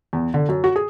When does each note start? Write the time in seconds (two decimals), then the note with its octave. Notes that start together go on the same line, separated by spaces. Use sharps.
0.13 E2
0.34 D3
0.49 F#2
0.64 F#4
0.76 G#4